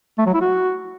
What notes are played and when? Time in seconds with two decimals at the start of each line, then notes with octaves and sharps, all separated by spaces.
0.18 A3
0.26 F#3
0.34 E4
0.41 F#4